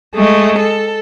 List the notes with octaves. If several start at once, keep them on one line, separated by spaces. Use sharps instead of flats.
G#3 A3
A4